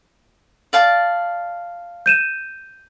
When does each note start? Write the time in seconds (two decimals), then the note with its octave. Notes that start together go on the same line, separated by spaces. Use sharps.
0.73 D5 F5 A5
2.06 G6 D#7 E7